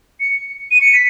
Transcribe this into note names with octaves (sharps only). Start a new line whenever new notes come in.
C#7
D#7
C#7
B6